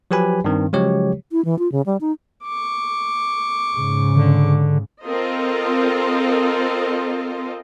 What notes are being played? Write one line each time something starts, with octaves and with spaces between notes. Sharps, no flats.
F3 F#3 G4 B4 G#5 B5
G2 D#3 C4
C#3 F3 F#3 G#3 G4 C#5
E4
E3
F4
C#3
G3
D#4
C#6 D6
G#2 C#3
D3
C4 F4 A4 A#4 C5 D#5